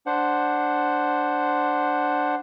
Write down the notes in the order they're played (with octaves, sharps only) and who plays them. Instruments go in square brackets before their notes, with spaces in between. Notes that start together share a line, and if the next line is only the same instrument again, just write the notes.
[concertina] D4 C5 F#5